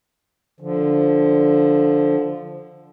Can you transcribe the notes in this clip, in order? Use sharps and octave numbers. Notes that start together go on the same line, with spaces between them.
D3 F3